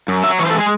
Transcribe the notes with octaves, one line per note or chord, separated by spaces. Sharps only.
F#2
F#3 E5
E3 C#5
C5
A4
G#3
G#4